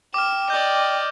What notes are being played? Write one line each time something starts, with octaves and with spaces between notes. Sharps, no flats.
G5 D6 F6 E7
D5 D#5 G6